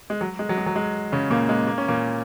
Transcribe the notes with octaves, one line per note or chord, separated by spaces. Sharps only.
G#3
F#3
G#3
F#3
G#3
F#3
G#3
C#3 C#4
A#2 A#3
G#3
A#3
C#4
A#2 A#3